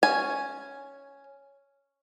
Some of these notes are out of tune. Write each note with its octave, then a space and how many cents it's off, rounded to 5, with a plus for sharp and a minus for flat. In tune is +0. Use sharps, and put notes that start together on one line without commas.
C#4 +0 G#5 +0